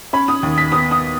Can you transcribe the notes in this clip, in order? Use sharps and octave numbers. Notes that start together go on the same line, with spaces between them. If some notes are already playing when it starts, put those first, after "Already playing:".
C#4 B5
D#6
D#2
B6
B3 D#6
D#6